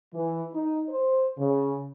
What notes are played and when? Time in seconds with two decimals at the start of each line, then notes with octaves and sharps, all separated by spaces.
0.14 E3
0.53 D#4
0.89 C5
1.39 C#3